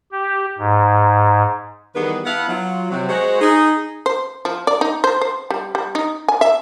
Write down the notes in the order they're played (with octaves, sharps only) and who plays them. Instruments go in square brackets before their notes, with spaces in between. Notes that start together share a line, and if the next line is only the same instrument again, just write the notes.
[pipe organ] G4
G#2
[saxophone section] D#3 E3 G3 B3 G#4 B4
B3 D4 E4 F5 F#5
F#3 F4
C3 F#3
G#3 F#4 C5
D#4 G#4
[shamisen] C5
F3
D5
D#4
C5
C5
G3
G3
D#4
G#5
E5